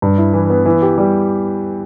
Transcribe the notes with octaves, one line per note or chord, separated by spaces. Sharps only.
G2
E4
E3
B3
E3
G4
G3